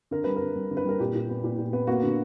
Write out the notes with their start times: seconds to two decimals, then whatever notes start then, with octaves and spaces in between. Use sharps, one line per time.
0.11 D3 A#4
0.24 G3 B4
0.36 A#4
0.42 D3
0.56 G3
0.71 D3
0.77 B4
0.86 G3 A#4
0.99 A#2 G4
1.15 A#2
1.30 B3
1.44 A#2
1.59 A#2
1.73 B3
1.87 A#3 F#4
2.03 D3